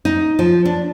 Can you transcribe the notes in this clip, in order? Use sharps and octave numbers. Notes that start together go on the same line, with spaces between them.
D#4
F3
D4